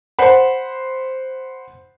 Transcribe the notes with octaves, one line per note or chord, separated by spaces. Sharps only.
C5 F#5 B5